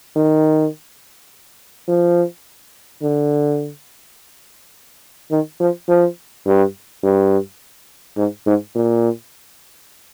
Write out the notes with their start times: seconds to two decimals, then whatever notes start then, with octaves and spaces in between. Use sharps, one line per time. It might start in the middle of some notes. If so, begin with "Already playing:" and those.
0.16 D#3
1.88 F3
3.02 D3
5.31 D#3
5.60 F3
5.88 F3
6.46 G2
7.03 G2
8.17 G#2
8.46 G#2
8.75 A#2